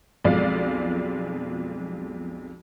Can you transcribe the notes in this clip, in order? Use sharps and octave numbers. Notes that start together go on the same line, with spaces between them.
B1 F2 F3 G#3 D5 F5